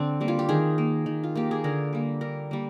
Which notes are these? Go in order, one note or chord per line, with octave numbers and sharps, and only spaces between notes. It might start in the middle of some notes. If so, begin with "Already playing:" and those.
Already playing: D3 C4 D4
G3 A#3
F4
G4
D#3 G#4
A#3
D#3
F4
A#3 G4
G#4
D3 A#4
G3 A#3
D3 A#4
G3 A#3